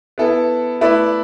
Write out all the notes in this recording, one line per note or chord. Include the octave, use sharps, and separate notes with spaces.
B3 E4 A4
A3 E4 B4 D5